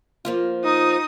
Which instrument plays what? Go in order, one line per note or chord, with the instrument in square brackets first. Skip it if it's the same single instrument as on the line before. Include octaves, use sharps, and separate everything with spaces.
[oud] F3 A#3 F4
[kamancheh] D#4 D#6